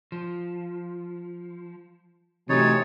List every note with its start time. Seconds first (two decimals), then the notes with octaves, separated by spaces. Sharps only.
0.12 F3
2.49 C3 E3 F#3 A3 D#4 C#5 A6